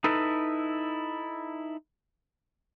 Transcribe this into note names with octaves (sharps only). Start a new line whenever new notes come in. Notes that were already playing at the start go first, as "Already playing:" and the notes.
D#4 E4 A4 B4